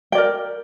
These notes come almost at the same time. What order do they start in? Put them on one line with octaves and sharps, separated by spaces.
G5 D5 A#4